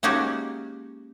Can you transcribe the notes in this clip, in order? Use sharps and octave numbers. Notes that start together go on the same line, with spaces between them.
G#3 A#3 C#4 D#4 F#4 G4